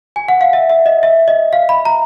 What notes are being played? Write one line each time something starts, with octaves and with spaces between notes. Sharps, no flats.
G#5
F#5
F5
E5
E5
D#5
E5
D#5
F5
B5
A#5